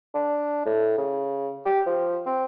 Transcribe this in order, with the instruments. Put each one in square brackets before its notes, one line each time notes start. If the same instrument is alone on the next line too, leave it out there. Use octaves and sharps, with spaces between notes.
[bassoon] D4
A2
C#3
G4
F3
C4